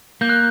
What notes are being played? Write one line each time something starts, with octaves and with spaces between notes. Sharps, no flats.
A#3 G6
F#6